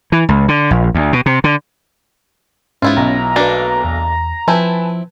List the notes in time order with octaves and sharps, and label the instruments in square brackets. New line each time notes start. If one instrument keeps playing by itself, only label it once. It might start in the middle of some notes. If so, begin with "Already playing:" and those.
[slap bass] E3
C#2
D3
A#1
D2
B2
C3
D3
[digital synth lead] G#2 [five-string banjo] B3 E4 F4 [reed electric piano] C#4
[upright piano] B1 [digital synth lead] A#5
[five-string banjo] A3 A#3 D4 [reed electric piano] F#4 B4
[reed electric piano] E2
[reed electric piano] F3 [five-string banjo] C4 E4 [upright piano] B4 G#5 A5